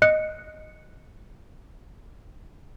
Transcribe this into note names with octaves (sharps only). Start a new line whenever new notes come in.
D#5 F#6 C#7